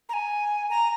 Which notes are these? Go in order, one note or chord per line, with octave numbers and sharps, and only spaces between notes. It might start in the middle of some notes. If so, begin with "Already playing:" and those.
A#5
G#5
A#5